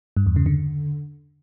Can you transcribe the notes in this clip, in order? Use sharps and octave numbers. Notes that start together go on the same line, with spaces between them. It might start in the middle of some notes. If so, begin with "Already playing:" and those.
G2
E2
C#3
D3